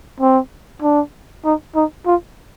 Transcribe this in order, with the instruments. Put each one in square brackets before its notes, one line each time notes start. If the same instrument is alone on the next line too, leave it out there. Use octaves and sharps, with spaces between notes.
[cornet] C4
D4
D#4
D#4
F4